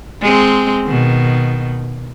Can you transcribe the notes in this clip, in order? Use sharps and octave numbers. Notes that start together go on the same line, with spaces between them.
G#3 C4
B2 D#3